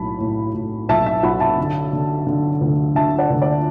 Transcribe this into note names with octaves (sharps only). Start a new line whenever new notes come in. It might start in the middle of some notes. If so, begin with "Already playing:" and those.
Already playing: B1 A2 A5 B5
A2
A2
B1 E5 A5
E5
B1 F#5 B5
E5 A5
D3
D3
D3
D2
D3 E5 A5
D5 F#5
D2
D5